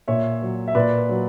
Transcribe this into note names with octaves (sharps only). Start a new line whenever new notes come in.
A#2 C#5 E5
F#3
E5
A#2 B4 D5
F#3